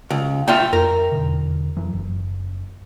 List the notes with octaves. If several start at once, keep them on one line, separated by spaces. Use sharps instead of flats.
C#2
F4 E5 G5
F2 A#4
E2 B2 D3
F2 E3 F#3
F#1